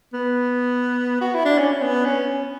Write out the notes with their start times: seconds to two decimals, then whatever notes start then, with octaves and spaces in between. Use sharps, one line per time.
0.13 B3
1.21 F#4
1.34 E4
1.45 D4
1.58 C#4
1.82 B3
2.05 C#4